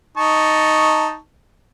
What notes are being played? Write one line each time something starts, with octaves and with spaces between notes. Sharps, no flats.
D#4 A5 C#6